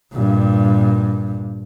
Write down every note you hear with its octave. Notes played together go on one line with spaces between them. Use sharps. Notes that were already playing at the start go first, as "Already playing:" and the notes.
G2 A#2